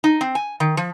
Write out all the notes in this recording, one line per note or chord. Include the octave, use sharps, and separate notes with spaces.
D#4
C4
G#5
D#3
F3